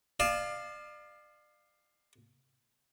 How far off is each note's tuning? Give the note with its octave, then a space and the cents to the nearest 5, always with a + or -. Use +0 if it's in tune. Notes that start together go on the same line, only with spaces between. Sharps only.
D5 +35 F5 +0 A5 -30